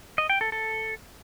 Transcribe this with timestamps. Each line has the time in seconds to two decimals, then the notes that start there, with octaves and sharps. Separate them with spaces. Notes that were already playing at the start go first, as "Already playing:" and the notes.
0.18 D#5
0.30 G5
0.41 A4
0.52 A4